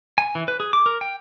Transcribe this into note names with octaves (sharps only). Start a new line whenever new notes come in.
G#5
E3
B4
G#4
D6
A#4
G5